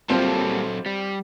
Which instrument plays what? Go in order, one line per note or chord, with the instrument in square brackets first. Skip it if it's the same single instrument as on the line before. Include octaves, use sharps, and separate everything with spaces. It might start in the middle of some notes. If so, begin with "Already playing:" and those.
[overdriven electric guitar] F#3 A4 [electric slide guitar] G3 A#3 [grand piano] C4 F4 C5
[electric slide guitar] G3